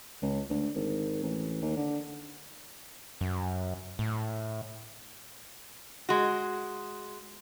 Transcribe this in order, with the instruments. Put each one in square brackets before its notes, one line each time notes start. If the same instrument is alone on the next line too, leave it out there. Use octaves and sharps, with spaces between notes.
[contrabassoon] C#2
D2
G#1
A1
D#2
D3
[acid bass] F#2
A2
[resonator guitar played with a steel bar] G#3 F#4